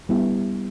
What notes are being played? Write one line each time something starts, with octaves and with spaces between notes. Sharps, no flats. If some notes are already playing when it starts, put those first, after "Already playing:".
G3 B3 E4